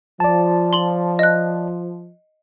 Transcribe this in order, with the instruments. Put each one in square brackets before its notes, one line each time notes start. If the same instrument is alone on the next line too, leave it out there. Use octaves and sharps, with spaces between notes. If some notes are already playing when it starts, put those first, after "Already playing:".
[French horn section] F3 [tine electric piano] D5 A5
[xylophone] C6 F#7
D#5 F#6